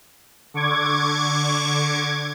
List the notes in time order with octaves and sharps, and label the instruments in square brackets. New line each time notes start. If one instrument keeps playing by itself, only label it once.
[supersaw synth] D3 C#6 D6 G#6